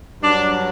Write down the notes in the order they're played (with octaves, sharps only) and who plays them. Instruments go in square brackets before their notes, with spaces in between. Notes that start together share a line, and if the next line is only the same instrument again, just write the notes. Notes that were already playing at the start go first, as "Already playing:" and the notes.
[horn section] G2 F#3 D4